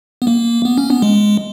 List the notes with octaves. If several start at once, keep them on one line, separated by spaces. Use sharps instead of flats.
B3
A#3
B3
C#4
B3
G#3